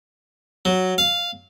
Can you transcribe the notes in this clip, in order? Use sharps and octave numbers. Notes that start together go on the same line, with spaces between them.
F#3
F5